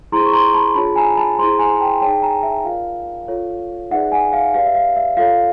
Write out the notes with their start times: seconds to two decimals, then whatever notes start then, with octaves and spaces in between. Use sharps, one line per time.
0.12 E4 G#4 C5 A#5 C6
0.25 C#6
0.33 A#5 C6
0.54 A5 B5
0.75 D4 F4 G#4 C#5 A5 B5
0.96 G#5 A#5
1.17 A5 B5
1.38 E4 G#4 C5 A#5 C6
1.59 G#5 A#5
1.81 G5 A5
2.01 D#4 G#4 C#5 G5 A5
2.22 G#5 A#5
2.43 E5
2.64 F4 A#4 D5 F5
3.28 F4 A4 C#5
3.91 D#4 G#4 B4 D5 E5 F#5
4.12 F#5 G#5
4.33 F5
4.54 G4 B4 D5 F5
4.66 E5
4.75 F5
4.96 E5
5.17 F4 A4 C#5 F5